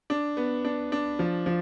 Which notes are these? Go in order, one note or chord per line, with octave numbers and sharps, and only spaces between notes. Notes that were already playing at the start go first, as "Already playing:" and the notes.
D4
B3
D4
D4
F3
F3